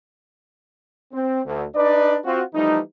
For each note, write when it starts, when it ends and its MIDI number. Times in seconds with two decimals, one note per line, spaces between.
1.12 1.40 60
1.46 1.64 38
1.74 2.18 62
1.74 2.18 63
1.74 2.18 71
1.74 2.18 74
2.25 2.42 60
2.25 2.42 65
2.25 2.42 66
2.54 2.79 52
2.54 2.79 53
2.54 2.79 55
2.54 2.79 57
2.54 2.79 63